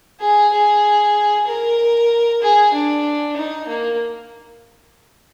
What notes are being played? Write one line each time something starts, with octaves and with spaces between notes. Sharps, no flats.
G#4
G#4
A#4
G#4
D4
D#4
A#3